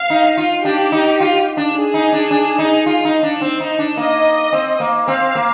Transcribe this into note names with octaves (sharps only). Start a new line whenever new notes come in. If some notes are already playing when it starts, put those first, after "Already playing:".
Already playing: F5
D#4
F4
D4 G4
D#4
F4
D4
G#4
D#4
D4
D4
D#4
F4
D#4
D4
C4
D#4
D4
A#3 D#5
C4
A#3
C4 F5
A#3